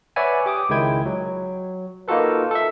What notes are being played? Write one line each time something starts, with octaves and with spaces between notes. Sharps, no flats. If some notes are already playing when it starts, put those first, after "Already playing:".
B4 C#5 D5 E5 F#5 G#5
G4 D6 D#6
C#2 D#3 G#3 E4 G5 G#6
F#3
A#3 D#4 F4 F#4 A4 B4
A4 E5